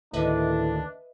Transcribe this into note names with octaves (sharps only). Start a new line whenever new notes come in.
D2 A2 D#3 D4 B4 D#5 E5